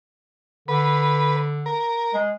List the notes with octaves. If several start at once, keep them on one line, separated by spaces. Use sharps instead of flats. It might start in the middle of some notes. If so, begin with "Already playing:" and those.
D3 B4
A#4
G#3